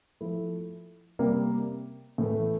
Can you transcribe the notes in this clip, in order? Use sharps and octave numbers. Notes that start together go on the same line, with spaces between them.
F3 A3 E4
C3 G3 A#3
A2 E3 A3